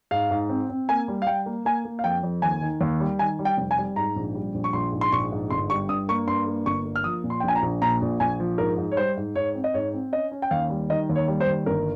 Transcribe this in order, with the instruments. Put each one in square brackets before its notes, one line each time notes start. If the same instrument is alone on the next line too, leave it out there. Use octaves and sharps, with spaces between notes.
[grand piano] G#2 F5
G#2
C4
C4
A#3 G#5
G3
F5
G3 G5
A#3
A#3 G#5
A#3
F5
F2 G5
F2
D#2 G#5
D#3
D#2
G3
D#3 G#5
G3
G5
F1
G#5
G3
G#2 A#5
A#1
G3
A#1
C#6
A#1 C6
G#2
C6
A#1 C#6
G#2
G1 C6
G3 C#6
G2 D#6
A#3 C#6
G2 C6
A#3
G1 C#6
A#3
F6
F3 D#6
A#2
C6
G5
A#1 G#5
A#5
A#1
A#2 A#5
A#1
A#1 G#5
F3
G#2 A#4
G#2
C#5
G3 C5
G#2
G#2 C#5
C4
D#5
G#2 C#5
C4
C#4 D#5
C#4
G5
D#2 F5
G3
D#3 D#5
D#2
C#5
G3
C5
D#2
G1 A#4